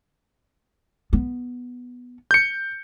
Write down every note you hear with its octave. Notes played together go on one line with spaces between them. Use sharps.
B3
G6 C#7